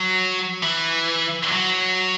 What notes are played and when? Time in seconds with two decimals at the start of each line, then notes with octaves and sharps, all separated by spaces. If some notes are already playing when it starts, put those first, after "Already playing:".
Already playing: F#3
0.63 E3
1.52 F#3